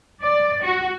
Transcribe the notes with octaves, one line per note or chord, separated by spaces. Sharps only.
D5
F#4